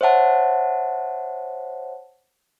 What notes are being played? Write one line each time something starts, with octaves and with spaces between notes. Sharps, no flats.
C5 C#5 E5 F#5 A5